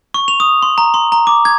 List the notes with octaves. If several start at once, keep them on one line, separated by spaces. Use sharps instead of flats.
C#6
F7
D#6
C6
A#5
C6
A#5
D6
G#6